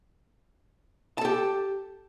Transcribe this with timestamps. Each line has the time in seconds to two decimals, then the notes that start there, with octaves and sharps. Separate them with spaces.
1.18 A5
1.21 A4
1.25 G4